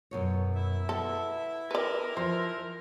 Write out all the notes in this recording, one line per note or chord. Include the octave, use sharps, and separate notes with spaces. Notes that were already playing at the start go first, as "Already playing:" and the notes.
F#2 B2 C#5
E4 E5
B3 A4
A#4 B4 D5
F3 C5